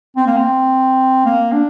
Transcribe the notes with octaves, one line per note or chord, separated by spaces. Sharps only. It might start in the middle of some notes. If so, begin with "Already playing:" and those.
C4
A#3
C4
A#3
D4